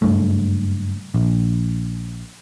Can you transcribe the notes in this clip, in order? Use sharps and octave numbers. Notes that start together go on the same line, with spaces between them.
F#1 G2 A3
A#1